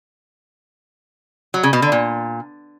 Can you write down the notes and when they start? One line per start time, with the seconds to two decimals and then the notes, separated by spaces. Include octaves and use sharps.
1.54 F#3
1.63 C#3
1.73 B2
1.82 D3
1.92 A#2